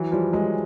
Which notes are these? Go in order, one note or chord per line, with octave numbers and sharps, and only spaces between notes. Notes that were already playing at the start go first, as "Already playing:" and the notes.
Already playing: E3 F#3
F3 G3
F#3 G#3